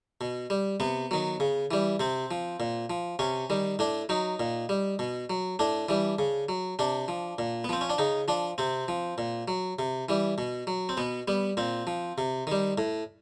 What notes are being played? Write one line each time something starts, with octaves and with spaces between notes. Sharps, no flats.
B2
G3
C3 B3
D#3 F#3
C#3
E3 G3
C3 C4
F3
A#2
F3
C3 C#4
D#3 G3
A2 D4
F#3 D#4
A#2
G3
B2
F#3
A2 D4
E3 G3
C#3
F#3
C3 D4
F3
A#2
B3
F3 C4
C#4
D4
C#3 D#4
F3 D4
C3 C4
F3
A#2
F#3
C3
E3 G3
B2
F#3
C4
B2 B3
G3 B3
A#2 C4
F3
C3
D#3 G3
A2